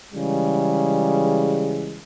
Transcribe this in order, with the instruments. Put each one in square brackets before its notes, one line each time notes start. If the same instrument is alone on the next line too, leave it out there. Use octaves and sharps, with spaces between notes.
[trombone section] C#3 E3 G3 G#3